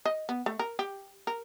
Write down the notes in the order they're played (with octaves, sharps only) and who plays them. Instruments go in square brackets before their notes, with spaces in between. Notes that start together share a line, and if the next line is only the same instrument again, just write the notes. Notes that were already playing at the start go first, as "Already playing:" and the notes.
[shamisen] D#5
B3
A3
A#4
G4
A#4